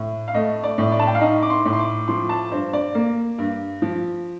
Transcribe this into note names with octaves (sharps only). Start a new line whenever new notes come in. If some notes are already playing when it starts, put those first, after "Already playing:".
Already playing: A2
F5
A3 D#5
D5
A2
D5
A5
G5
F5
D#4 D#5
D6
C6
A2
C6
D6
F3 C6
A5
G2 C5
D5
A#3
G2
F3